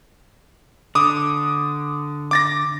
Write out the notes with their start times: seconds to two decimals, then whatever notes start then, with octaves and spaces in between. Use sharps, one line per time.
0.95 D3 D6 D#6
2.31 D6 A6 A#6